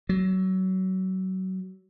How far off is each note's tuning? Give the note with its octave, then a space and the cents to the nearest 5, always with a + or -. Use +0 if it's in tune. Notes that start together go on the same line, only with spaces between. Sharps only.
F#3 +25